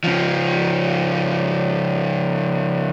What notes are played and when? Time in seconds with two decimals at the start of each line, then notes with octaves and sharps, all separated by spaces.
0.04 C#3 F3